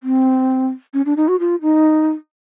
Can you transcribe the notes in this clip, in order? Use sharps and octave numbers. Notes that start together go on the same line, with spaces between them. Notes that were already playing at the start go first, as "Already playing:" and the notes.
C4
C#4
D4
D#4
F#4
F4
D#4